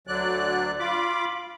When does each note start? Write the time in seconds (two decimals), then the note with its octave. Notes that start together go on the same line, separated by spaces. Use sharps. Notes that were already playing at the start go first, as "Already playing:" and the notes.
0.07 D2 D3 F#3 D5 F#6
0.79 F4 B5 D6